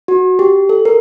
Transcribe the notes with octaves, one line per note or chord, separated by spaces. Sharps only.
F#4
G4
A4
A#4